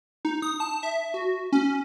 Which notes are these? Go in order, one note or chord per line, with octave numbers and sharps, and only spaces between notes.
D#4
D#6
A5
E5
F#4
C#4